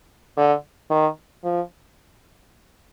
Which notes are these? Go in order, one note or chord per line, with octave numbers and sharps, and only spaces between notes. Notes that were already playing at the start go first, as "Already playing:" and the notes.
D3
D#3
F3